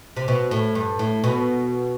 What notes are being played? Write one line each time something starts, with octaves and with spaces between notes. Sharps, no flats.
C3
B2
A2
G2
A2
B2